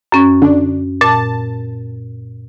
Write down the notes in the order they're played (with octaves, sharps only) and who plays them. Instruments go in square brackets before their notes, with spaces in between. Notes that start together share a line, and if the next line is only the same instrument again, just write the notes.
[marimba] F#2 C#4 C#6
[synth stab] D3 D4
[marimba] A#2 [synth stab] A5